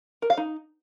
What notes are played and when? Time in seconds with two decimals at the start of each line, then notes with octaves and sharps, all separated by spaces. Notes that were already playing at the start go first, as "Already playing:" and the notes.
0.22 A#4
0.30 F5
0.37 D#4